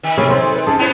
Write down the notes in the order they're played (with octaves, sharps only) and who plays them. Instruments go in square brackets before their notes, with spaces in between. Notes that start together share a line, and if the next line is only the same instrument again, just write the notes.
[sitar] D#3
[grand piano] C3 A#3 [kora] C#4 G#4 B4 [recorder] A4
[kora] C4 [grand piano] C6
[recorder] B4
[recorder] C#4 [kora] G#4 A4 [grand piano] A5
[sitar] B3 C#4 C5 [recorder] E4